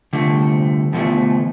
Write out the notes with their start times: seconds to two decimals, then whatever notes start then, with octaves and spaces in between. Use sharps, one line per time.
0.13 C2 D3 F3 A3
0.92 D2 B2 E3 F3 A3